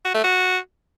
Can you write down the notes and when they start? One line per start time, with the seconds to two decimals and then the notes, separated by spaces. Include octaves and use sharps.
0.05 F#4
0.15 A3
0.24 F#4